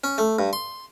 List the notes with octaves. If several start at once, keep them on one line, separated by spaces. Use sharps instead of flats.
C#4
A3
G2
C6